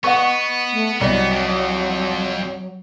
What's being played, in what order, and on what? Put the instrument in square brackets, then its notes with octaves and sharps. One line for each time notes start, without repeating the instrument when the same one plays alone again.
[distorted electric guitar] B3 [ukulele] B4 D#5 F#5 [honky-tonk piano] C#6
[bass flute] A3
[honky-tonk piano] C2 [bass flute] F#3 [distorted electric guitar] B3 [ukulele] D5 D#5
[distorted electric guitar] F2